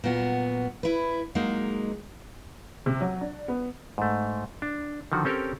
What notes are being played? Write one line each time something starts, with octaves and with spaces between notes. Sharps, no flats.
A#2 F#3 B3 F#4
E4 B4
F#3 G#3 A#3 D#4
C3
F#3
D4
B3
G#2 A3
D4
D3 D#3 F3 F#4
C4 C#4 G4 A4 A#4 C#5